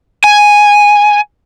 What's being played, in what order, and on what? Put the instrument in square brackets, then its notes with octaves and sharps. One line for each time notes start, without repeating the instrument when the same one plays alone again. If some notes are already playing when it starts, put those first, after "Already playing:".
[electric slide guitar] G#5